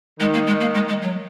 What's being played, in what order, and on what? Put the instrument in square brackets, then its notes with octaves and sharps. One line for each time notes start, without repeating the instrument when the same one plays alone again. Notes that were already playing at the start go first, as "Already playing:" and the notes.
[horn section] D#3 [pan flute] G#3
[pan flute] A#3
G#3
A#3
G#3
G#3
F#3